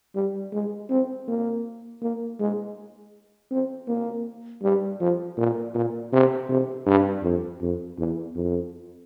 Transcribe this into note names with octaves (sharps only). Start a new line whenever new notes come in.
G3
G#3
C4
A#3
A#3
G#3
C4
A#3
G3
F3
A#2
A#2
C3
C3
G2
F2
F2
E2
F2